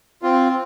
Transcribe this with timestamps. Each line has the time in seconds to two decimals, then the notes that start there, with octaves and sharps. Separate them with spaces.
0.22 C4 F4